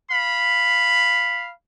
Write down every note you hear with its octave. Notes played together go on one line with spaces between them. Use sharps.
F5 B5